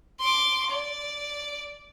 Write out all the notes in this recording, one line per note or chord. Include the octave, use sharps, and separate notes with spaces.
C6 D6
D5